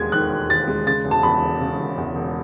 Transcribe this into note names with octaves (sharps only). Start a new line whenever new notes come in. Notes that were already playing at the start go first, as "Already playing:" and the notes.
Already playing: E1 D#2 D#3 G#3 G#6
D#3 F#6
E1
D#2 A6
G#3
C#3 A6
E1
A5
E2 B5
E1
C#3
E1
E2
E1